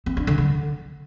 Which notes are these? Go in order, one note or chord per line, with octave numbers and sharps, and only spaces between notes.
C4
D4
D3
D3